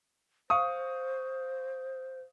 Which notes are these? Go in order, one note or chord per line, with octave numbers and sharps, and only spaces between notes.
C5 F5 C#6 D#6